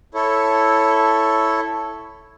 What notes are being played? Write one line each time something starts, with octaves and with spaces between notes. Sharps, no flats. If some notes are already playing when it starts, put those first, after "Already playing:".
E4 A4 C#5